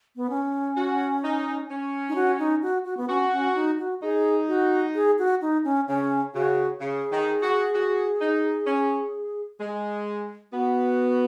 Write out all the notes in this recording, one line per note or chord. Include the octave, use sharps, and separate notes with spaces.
B3
C#4
F#4
D#4
C#4
D#4
F#4
D#4
F#4
F#4
B3
C#4 F#4
C#4
D#4
F#4
D#4 G#4
F#4
G#4
F#4
D#4
C#4
C#3 C#4
C#3 F#4
C#3 G#4
D#3
F#4
F#4
D#4
C#4
G#3
B3 F#4